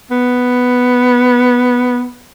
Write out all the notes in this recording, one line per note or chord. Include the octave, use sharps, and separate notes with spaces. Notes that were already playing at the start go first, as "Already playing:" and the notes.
B3